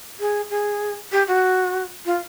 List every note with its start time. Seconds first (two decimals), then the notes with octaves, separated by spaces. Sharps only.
0.20 G#4
0.50 G#4
1.12 G4
1.28 F#4
2.06 F4